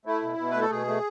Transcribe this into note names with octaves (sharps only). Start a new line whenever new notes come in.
A3 E4
B2
B2
A3 B4
A4
B2 G#4
A3